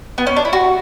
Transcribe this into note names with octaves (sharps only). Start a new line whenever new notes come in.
B3
C#4
D4
E4
F#4